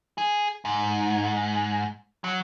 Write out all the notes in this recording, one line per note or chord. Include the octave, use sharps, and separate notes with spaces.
G#4
G#2
F#3